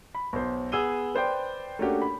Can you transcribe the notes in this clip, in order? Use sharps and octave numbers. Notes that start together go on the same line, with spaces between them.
B5
B1 C5
B3 G#4 E6 D#7 G7
B4 C5 D5 G5
A3 A#3 C#4 D4 F#4 G4
B5